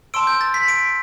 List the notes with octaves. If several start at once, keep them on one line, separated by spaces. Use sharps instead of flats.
A5 C6 E6 D7
G6
A6
B6
D7